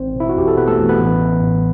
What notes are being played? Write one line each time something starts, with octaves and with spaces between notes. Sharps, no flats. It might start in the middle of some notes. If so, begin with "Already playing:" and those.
Already playing: A1 C4 C5
B2
E4
F#4
E2 G4
A4
B2 B3 B4
A3 A4
E2
B3 B4
A1
E3
A2